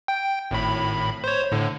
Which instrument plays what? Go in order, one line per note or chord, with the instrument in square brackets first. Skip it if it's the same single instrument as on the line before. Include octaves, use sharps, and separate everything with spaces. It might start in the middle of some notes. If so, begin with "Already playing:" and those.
[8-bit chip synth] G5
G#1 A2 B5
C5 C#5
A2 D3